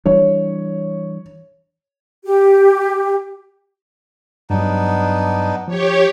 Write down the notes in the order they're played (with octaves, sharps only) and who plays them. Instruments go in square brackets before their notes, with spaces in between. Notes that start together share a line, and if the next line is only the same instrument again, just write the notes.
[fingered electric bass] E3 G3 D4 [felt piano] C#5
[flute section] G4
[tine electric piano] G2 F#3 [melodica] B3 D4 D#4
[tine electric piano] F3 [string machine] G4 C#5